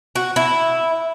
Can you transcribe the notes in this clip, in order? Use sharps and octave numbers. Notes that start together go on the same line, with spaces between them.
F#4
E4